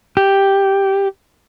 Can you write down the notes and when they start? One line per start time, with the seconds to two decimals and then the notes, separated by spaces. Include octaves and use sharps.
0.17 G4